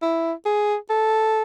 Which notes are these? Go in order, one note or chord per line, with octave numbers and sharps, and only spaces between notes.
E4
G#4
A4